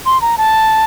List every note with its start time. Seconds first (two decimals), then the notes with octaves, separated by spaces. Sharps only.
0.06 C6
0.22 A#5
0.38 A5